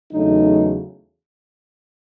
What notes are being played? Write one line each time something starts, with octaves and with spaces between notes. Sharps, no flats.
E2 C#3 F#3 A3 D#4